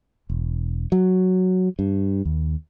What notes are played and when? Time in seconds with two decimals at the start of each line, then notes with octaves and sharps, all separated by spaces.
0.30 E1
0.92 F#3
1.79 G2
2.25 D#2